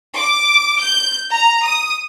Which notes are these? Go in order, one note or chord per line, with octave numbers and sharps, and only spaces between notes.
D6
G6
A#5
D#6